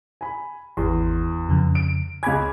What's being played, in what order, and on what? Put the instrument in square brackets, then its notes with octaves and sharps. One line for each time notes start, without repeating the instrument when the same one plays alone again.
[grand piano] G#5 B5
[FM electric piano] G#1 C6 [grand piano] E2
[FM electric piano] F2 C#3
[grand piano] D7
[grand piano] C#2 G#6 [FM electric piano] G#5 B5 D6